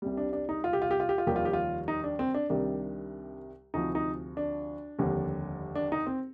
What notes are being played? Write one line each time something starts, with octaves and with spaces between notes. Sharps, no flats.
C2 C3 G3
D4
D4
D#4
F4
G4
F4
G4
F4
G4
F4
F1 D#2 D#3 G3 G4
F4
G4
F4
D#4
D4
C4
D4
C2 C3 D#3 G3 D4
D2 C3 F3 D#4
D#4
D4
F1 D#2 D3 G3
D4
D#4
C4